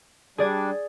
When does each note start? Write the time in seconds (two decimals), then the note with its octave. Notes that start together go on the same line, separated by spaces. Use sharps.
0.38 G3 D4 G#4 D5 G#6